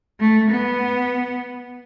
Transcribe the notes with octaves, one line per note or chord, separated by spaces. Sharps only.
A3
B3